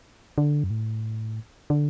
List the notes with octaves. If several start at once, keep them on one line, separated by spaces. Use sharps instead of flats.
D3
F#2
A2
D3